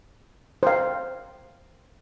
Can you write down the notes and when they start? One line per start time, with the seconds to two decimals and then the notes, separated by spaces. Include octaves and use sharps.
0.63 C5 F5